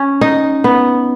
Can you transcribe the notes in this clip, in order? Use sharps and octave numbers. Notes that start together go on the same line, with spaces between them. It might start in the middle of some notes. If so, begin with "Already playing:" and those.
Already playing: C#4
D#4
B3